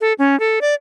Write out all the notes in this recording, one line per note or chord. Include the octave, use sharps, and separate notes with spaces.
A4
C#4
A4
D5